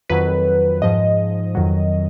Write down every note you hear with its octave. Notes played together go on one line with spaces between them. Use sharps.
F2 D#3 F#3 B4
G#2 F3 D#5
F2 D#3 F#3